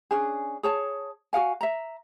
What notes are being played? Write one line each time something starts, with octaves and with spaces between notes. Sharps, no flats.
C#4 D4 G#4
G#4 C#5 A5
F#4 G#4 F5 G#5
E5 A#5